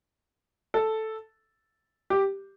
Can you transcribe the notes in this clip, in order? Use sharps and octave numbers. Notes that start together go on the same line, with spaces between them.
A4
G4